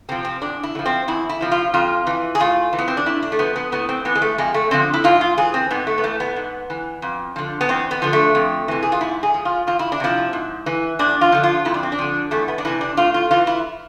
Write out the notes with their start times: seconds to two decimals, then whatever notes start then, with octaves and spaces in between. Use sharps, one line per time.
0.09 C3 F3 C4
0.25 C4
0.41 E2 D4
0.63 E4
0.75 D3
0.79 F3
0.85 C4
1.08 E2 E4
1.29 E4
1.41 C3 F3
1.51 F4
1.74 F2 F4
2.07 E3
2.35 G#4
2.40 A2 F4
2.73 E3
2.78 B3
2.88 C4
2.97 D4
3.06 A2 E4
3.23 D4
3.32 A3
3.39 F3 B3
3.56 B3
3.72 A2 B3
3.89 C4
4.05 E3 B3
4.15 G#3
4.22 A3
4.38 F2 G#3
4.54 A3
4.71 D3 F3 C4
4.94 E4
5.04 G#2 F4
5.21 F4
5.37 E3 G#4
5.54 C4
5.71 G#2 B3
5.87 A3
5.98 B3
6.03 E3 A3
6.20 B3
6.36 G#2
6.70 E3
7.02 F2
7.36 D3 F3
7.61 B3
7.69 E2 C4
7.91 B3
8.02 D3 F3
8.13 A3
8.35 F2
8.68 C3 E3
8.83 G#4
8.92 F4
9.01 G#2 E4
9.23 G#4
9.34 F3
9.45 F4
9.67 E2 F4
9.79 E4
9.92 D4
10.00 C3 F3 E4
10.33 G#2
10.66 E3
10.99 E2 D4
11.21 F4
11.32 D3 F3
11.43 F4
11.65 F2 E4
11.74 D4
11.83 C4
11.92 D4
11.99 D3 F3
12.31 E2 A3
12.48 B3
12.58 D4
12.65 C3 E3 E4
12.81 D4
12.97 A2 F4
13.14 F4
13.31 E3 F4
13.47 E4